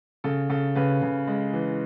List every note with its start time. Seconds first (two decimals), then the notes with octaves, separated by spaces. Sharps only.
0.24 C#3 A4
0.50 C#3 A4
0.75 C#3 B4
1.02 C#3
1.28 G#3
1.53 E3